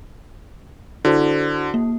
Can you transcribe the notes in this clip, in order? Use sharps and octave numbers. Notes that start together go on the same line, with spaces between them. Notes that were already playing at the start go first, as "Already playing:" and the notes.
D3 E4 F#4 C5
A#3